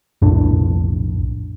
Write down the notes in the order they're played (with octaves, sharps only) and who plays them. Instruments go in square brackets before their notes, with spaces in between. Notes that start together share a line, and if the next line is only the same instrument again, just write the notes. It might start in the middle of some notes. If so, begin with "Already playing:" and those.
[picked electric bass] B1 F2 A2 D4